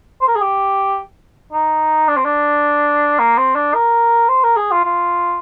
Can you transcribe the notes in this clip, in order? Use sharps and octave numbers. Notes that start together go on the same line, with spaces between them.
C5
A#4
G#4
G4
D#4
D4
C4
D4
A#3
C4
D4
A#4
C5
A#4
G#4
F4
F4